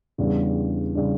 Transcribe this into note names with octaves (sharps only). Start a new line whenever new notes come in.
E2 C#3 G3 D4
C#3 G3 D4